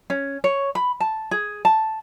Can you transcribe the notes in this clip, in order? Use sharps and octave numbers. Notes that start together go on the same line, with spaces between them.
C#4
C#5
B5
A5
G#4
A5